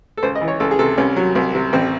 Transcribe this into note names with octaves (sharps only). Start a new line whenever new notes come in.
A4
C#2 C5
D#5
E3
C#5
C#2 A4
G#4
C3 A4
C2 C#4
F#3
C2
C3
A1 C4